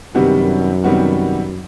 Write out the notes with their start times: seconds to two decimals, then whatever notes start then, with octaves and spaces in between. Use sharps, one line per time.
0.15 F#2 C3 D#3 G3 B3 F#4
0.84 C3 D#3 G3 B3 F#4